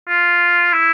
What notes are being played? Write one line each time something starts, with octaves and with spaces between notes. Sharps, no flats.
F4
E4